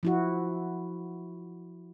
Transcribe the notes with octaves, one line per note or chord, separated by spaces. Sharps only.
F3 E4 F#4